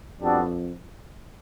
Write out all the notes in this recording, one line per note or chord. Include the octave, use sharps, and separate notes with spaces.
F2 G3 B3 D4 F#4 A4